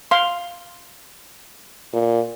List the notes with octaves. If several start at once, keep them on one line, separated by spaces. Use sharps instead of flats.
F5 C6
A#2